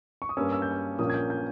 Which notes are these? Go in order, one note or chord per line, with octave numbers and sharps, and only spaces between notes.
C#6
D#6
G2 G3 A#3 C#4 E6
E6
G6
E6
A#1 A#2 A#3 C#4 D#6
G#6
G6
G6